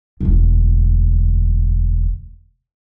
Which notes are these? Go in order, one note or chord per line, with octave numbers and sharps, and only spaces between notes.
E1 D2